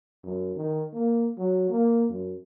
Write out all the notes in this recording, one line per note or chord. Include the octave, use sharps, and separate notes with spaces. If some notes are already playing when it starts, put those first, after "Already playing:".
F#2
D#3
A#3
F#3
A#3
F#2